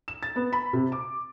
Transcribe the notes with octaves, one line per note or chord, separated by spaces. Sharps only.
E7
A6
B3
B5
C3
D6